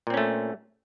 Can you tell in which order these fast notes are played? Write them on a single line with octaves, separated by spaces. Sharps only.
A#2 C4 C#4 A3